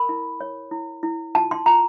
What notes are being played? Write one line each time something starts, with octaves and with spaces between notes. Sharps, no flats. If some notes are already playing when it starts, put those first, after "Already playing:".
Already playing: A#4 B5
E4
C#5
E4
E4
F4 A5
C6
F4 A#5